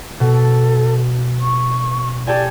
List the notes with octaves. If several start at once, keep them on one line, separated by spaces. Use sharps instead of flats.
B2 A4
C#6
G4 A4 D5 G#5